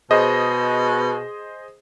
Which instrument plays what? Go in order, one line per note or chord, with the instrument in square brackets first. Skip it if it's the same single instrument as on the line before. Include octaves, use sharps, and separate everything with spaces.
[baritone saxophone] B2 [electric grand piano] G#4 C5 D#5